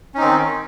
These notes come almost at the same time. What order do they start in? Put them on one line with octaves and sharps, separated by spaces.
C#4 D#4 C4 D#3